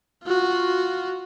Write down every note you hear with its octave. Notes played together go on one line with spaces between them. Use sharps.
F4 F#4